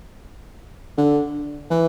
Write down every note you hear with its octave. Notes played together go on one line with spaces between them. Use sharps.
D3
E3